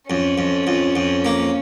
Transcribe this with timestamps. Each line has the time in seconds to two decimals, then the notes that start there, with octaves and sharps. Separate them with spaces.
0.09 F2 C#4
0.38 F2
0.67 F2
0.96 F2
1.25 A#3